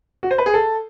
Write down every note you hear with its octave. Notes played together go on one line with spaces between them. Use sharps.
F#4
C5
B4
G#4
A4